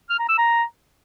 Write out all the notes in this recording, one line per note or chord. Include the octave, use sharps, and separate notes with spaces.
F6
A#5
E6
A#5